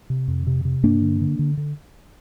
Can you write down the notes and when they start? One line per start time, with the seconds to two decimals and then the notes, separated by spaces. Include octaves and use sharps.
0.10 C3
0.28 F2
0.47 C3
0.65 C3
0.83 G2 A#3 D4
1.02 D3
1.21 D3
1.39 D3
1.57 D3